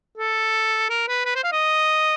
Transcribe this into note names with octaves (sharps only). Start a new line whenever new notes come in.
A4
A#4
B4
B4
C5
F5
D#5